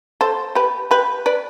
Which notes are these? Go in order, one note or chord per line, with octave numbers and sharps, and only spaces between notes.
A4 C5
G4 B4
G4 B4
B4 D5